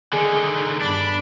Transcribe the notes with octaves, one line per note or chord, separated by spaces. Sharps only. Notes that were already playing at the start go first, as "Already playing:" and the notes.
D3 D#3 G#4
G1 D4 B5